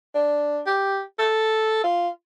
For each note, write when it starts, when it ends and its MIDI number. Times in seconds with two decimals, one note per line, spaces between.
0.15 0.60 62
0.66 1.02 67
1.19 1.81 69
1.84 2.09 65